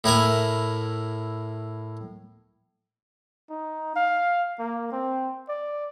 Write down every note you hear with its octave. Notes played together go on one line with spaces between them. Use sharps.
A2 E4 A#4 G#5
D#4
F5
A#3
C4
D5